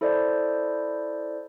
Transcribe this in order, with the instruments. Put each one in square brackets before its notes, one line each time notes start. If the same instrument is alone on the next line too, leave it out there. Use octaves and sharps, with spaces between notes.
[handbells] E4 A4 C5 D5 D#5